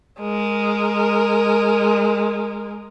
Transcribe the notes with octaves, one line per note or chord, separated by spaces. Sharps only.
G#3 A#4